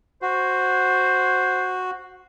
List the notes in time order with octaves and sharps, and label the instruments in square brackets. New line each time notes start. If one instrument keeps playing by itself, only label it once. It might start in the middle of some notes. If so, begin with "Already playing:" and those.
[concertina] F#4 [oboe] C5